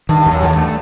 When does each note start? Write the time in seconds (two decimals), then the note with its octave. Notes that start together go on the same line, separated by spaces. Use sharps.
0.09 G2 D#3
0.26 D#2
0.31 F#2
0.42 D#2
0.48 A2
0.53 G2 A3